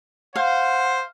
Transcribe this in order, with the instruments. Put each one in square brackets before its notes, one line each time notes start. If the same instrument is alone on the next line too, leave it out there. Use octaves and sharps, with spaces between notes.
[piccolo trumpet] C5 [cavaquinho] F5 [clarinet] F#5